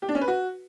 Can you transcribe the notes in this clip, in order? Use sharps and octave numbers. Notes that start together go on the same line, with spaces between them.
G4
D4
C#4
B4
F#4